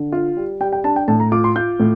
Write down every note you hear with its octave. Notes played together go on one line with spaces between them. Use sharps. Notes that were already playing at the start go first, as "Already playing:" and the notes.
Already playing: D3
F4
G3
G3 G5
G5
D4 A5
G5
A2 A5
A#5
F4 D6
C6
F4 G6
A2